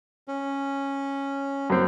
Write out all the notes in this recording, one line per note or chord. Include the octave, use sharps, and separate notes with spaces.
C#4
F#2 C4